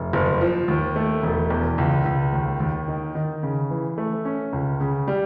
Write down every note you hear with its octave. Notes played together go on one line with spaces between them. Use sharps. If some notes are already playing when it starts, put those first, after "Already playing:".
Already playing: F1
F#1
F3
D#2
A3
E1
E2
C#2
C#2
D#2
D#2
D#3
D#3
C#3
E3
A3
C#4
C#2
C#3
G3